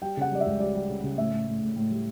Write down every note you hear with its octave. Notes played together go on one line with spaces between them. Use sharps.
G3 G5
C#3 F#5
G3 D5
E5
C#2
G3 D5
G3
C#3
C#3
A2 E5
A2
A2
A2
A2
G3